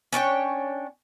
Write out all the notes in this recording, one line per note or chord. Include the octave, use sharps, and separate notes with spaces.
C#4 D4 C#5 G5